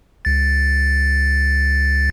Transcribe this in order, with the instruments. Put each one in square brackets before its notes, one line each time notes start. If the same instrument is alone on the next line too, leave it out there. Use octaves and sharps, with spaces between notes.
[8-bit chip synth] C#2 A6